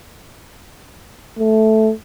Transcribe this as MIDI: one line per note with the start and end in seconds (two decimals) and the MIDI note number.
1.39 1.92 57